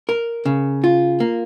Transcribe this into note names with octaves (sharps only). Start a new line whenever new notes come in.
A#4
C#3
F4
A#3